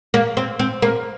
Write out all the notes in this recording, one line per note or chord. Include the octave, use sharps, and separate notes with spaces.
A#3
C4
C4
A#3